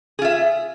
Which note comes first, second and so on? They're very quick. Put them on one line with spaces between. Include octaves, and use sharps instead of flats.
G#4 F4 E5